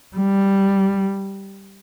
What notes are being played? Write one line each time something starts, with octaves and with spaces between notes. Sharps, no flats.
G3